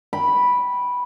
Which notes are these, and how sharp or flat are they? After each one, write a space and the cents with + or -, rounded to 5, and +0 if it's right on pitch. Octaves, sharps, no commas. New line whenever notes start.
G5 +0 B5 -5